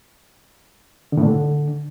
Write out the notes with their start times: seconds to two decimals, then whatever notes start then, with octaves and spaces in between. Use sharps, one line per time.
1.12 D3
1.17 A2
1.22 D3